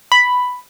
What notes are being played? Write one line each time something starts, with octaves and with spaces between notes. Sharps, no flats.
B5